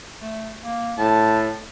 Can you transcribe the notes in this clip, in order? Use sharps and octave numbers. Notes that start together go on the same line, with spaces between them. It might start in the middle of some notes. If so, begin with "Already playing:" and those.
A3
A#3
A2 A5